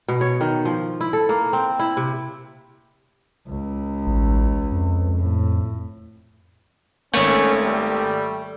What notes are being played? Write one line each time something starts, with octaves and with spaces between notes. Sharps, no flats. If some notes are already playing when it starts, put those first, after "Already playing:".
B2
C#5
D#3
F3
E4
A4
A#3
C4
E4
C3
C#2
A1
F2
A2
G#1 A3 A#3 C#4 C#5
G3